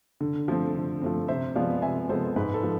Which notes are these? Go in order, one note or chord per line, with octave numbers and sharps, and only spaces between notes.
D3
F3 A3 C4
D3
F3 A3 C4
C3 C5 E5
F3 G#3 B3 D5 F5
C3 E5 G#5
F3 G#3 B3 A4 C5
G#2 G#4 B4
A4
F3 G#3